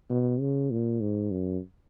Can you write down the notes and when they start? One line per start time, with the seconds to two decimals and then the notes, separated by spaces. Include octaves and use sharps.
0.10 B2
0.41 C#3
0.71 A#2
1.01 G#2
1.31 F#2